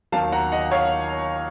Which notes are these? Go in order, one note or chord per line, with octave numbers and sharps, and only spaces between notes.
D#2 D#3 F#3 F5 A5
F#5 A#5
D#5 F#5
C#5 F5